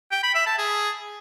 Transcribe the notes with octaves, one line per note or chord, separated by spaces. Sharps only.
G5
B5
E5
A5
G#4